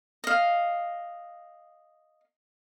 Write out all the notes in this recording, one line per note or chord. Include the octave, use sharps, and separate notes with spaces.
D#5 F5